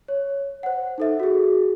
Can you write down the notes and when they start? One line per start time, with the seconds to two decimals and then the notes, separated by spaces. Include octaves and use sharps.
0.08 C#5
0.63 C5 F#5
0.98 D#4 A4 E5
1.20 F#4 G#4